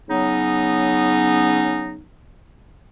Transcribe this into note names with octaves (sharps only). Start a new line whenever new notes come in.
C#3 F#3 B3 C#4 D#4